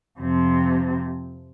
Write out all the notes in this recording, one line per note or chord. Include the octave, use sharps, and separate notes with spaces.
F2 C3 F3 C4